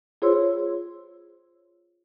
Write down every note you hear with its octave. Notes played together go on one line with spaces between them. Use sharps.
F4 G#4 C5 C#5 C6 E6